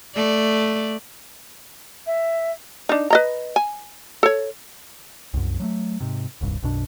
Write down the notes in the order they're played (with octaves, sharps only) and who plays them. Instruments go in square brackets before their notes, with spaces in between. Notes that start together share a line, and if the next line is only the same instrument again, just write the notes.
[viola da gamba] A3 D5
[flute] E5
[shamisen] D4 D#4
B4 D#5 A#5
G#5
A4 C#5
[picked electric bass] C2 F#2
F#3 G#3 A3
G#2 C3
D#1 C2 G2
B1 F#2 B2 D4